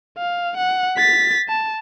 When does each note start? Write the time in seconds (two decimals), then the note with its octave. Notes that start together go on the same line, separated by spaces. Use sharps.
0.18 F5
0.57 F#5
0.97 A6 B6
1.49 A5